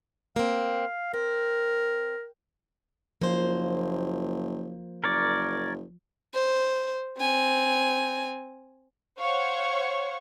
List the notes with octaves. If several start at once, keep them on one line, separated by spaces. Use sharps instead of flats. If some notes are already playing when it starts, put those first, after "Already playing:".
A#3 C4 F5
C4 A#4
F#1 F3 A#3 C5
F#1 A#4 C#5 D5
C5
C4 G#5
C5 C#5 F5 F#5 C#6